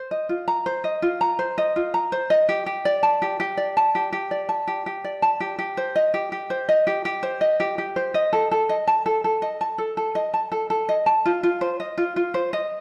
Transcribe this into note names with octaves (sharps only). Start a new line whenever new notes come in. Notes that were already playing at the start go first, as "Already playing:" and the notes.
Already playing: C5
D#5
F4
A#5
C5
D#5
F4
A#5
C5
D#5
F4
A#5
C5
D#5
G4
G4
D5
A5
G4
G4
D5
A5
G4
G4
D5
A5
G4
G4
D5
A5
G4
G4
C5
D#5
G4
G4
C5
D#5
G4
G4
C5
D#5
G4
G4
C5
D#5
A4
A4
D#5
A5
A4
A4
D#5
A5
A4
A4
D#5
A5
A4
A4
D#5
A5
F4
F4
C5
D#5
F4
F4
C5
D#5